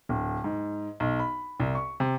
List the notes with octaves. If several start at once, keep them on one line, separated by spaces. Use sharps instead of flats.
D1
G#2
B1
B5
C2
C#6
C3